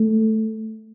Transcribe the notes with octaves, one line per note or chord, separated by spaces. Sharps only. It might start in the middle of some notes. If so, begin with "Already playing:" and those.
Already playing: A3